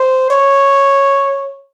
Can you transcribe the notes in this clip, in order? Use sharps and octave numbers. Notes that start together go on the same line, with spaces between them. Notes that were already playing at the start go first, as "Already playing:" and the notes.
Already playing: C5
C#5